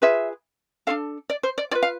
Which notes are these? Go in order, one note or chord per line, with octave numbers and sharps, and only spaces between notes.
F4 G#4 B4 E5
D4 F4 A4 F5
D5
C5
D5
F4 B4 D5
F5